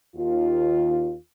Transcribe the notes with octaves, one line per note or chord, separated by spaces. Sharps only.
D#2 F4